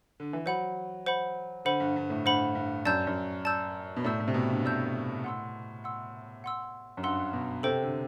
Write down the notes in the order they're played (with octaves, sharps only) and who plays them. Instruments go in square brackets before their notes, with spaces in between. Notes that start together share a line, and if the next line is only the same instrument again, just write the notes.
[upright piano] D3
E3
[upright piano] F#3 [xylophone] C5 F#5 B5
[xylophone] C5 F#5 B5
[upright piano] D3 [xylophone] C5 F#5 B5
[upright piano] G2
G2
A2
[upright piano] G2 [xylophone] C5 F#5 B5
[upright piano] G2
[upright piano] F#2 [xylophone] D5 A5 E6 G6
[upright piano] F#2
[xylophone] D5 A5 E6 G6
[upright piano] B2
[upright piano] A2 [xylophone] D5 A5 E6 G6
[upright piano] A2
C3
B2
G2
[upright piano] A2 [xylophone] D5 A5 E6 G6
[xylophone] F#5 C6 E6
F#5 C6 E6
F#5 C6 E6
[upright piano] F#2
[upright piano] G2 [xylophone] F#5 C6 E6
[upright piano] B2
[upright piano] C3 [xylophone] A4 C5 G5
[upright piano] D3